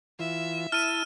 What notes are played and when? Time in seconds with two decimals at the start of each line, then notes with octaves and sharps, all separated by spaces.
0.19 E3 F4 E5
0.72 E4 A5 E6 F6 D#7